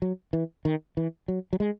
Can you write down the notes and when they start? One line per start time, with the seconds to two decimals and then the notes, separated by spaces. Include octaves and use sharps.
0.02 F#3
0.33 E3
0.65 D#3
0.97 E3
1.28 F#3
1.53 F#3
1.60 G#3